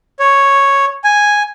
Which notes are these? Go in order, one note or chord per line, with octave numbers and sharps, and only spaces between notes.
C#5
G#5